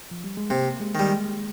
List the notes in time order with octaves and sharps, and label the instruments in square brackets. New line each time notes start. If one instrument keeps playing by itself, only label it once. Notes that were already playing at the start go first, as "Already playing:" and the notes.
[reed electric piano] F3
G3
G#3
[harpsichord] C3 [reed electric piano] A#3
[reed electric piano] G#3
[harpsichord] D#3 G3
[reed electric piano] G#3